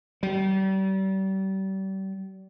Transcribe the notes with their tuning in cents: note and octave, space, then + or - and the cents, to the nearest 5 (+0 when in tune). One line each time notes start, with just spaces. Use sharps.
G3 -35